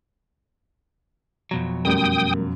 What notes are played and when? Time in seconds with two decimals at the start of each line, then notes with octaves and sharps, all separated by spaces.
1.51 F2 B2 F#3
1.85 F#2 G3 A3 A#4 G5 D#6